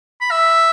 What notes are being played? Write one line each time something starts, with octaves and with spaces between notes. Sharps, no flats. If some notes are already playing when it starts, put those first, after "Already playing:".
B5
E5